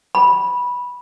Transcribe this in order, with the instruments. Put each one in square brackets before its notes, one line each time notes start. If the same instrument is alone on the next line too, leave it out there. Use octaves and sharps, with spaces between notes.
[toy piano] B5